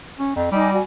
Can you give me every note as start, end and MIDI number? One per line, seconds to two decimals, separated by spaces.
0.19 0.34 61
0.36 0.51 41
0.51 0.79 55
0.51 0.70 63
0.51 0.70 80
0.51 0.70 86
0.73 0.82 66
0.73 0.82 74
0.73 0.82 80